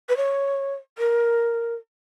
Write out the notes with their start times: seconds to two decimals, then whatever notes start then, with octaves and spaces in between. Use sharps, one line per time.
0.09 B4
0.17 C#5
0.98 A#4